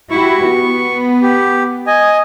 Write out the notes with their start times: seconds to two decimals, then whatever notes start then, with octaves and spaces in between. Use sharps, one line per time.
0.10 E4 F#4 G4 C#6
0.46 B3
1.22 G4
1.87 D#5 G#5